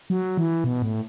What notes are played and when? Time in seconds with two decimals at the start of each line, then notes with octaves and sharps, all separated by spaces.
0.10 F#3
0.37 E3
0.64 B2
0.82 A2